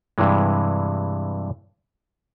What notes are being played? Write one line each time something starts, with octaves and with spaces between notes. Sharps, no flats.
G2 C3 E3 G#3